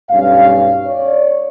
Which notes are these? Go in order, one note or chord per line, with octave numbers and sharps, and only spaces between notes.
B1 G2 C#4 F5
C#5 D5